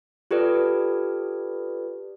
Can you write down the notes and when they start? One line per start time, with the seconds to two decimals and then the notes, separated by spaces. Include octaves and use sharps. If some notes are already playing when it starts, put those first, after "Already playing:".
0.31 F4 G4 A4 B4 D5